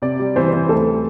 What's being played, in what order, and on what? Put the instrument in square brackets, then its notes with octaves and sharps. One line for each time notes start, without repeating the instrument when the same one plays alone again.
[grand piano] C3 [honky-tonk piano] D5
[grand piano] G3
[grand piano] E3 [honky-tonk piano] C5
[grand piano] E3
[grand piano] D2 [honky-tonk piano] A4